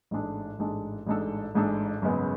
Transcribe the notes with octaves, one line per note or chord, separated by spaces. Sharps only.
A1 G#2 G#3 D4 A4
A1 G#2 G#3 D4 A4
A1 G#2 G#3 D4 A4
A1 G#2 G#3 D4 A4
G#1 F#2 C#3 G#3 B3